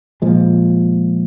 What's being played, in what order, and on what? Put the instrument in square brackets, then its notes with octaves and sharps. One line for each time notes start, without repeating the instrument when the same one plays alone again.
[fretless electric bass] A#2 F3 G#3